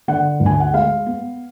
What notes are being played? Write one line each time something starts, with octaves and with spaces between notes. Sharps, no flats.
D3 F#5
D2
G#5
F#5
G#3 F5
B3